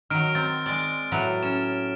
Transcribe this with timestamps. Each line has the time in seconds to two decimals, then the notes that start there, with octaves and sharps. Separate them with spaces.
0.10 D#3 F#3 F6 D7
0.35 C4 A6
0.66 G#3 D5
1.12 A2 F#3 B4
1.43 C#4 E7